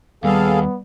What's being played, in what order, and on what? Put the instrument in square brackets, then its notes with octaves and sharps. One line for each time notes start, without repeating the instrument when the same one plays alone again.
[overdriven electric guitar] D#2 [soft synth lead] G3 [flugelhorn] B3 [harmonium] G#4 A4 F5